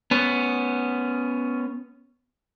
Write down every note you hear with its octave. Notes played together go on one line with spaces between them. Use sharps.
B3 C#4